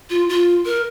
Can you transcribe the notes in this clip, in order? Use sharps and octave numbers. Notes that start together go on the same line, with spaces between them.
F4
F4
A#4